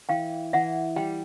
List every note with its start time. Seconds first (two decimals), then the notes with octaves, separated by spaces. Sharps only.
0.09 E3 F5 G5
0.53 E3 E5 F#5
0.96 G3 G5